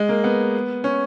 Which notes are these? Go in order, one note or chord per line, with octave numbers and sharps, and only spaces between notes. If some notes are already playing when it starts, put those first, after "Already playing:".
Already playing: G#3
A#3
B3
C#4